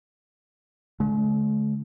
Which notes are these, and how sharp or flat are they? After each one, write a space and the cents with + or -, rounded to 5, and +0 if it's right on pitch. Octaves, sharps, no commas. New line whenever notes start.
D3 -25 G#3 +45